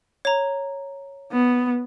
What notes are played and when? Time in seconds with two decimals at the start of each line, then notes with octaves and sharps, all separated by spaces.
0.25 C#5 A#5
1.32 B3